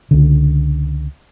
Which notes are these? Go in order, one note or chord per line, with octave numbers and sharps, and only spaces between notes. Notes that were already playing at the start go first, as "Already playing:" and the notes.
C#2 D3